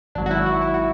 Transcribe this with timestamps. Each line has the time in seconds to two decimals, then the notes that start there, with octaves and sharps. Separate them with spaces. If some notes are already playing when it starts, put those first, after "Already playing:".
0.15 G#1 G#2 F#3 D4
0.26 F#4
0.31 E4
0.46 F#4
0.62 E4
0.74 F#4